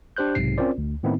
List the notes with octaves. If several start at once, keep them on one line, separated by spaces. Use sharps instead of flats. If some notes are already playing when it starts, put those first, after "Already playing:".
D4 G4 C5 F#6 G6
B1 G#2 C3 C7
C4 C#4 F4 A#4 C5 D5
D2
A2 D#3 B3 C4 D#4 E4